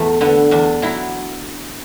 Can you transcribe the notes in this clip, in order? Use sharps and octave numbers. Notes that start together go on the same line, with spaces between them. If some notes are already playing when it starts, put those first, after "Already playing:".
Already playing: E2 A3
D3 B3
E2 D4
F#3 E4